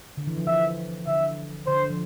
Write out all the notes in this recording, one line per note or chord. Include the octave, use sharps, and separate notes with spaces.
D3
E3
F3
E3 E5
D3 E5
D3 C5
F3